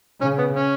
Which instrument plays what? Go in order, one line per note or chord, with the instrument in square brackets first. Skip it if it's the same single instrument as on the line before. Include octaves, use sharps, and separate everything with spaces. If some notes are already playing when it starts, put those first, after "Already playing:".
[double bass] C#3 [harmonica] C#4
[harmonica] B3
C#4